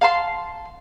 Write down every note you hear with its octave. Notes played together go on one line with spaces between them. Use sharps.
F5 A5 C6